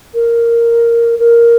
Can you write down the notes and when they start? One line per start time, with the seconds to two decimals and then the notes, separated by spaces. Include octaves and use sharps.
0.14 A#4
1.19 A#4